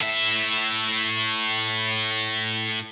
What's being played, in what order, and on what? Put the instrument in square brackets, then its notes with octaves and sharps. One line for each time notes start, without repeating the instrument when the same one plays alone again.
[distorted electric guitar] A2 E5